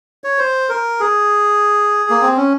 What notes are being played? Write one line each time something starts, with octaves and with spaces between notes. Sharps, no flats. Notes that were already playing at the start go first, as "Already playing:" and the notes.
C#5
C5
A#4
G#4
A#3
C4
C#4